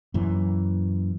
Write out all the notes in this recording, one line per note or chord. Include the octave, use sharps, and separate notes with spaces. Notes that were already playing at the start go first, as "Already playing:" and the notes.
F#2 A#2 E3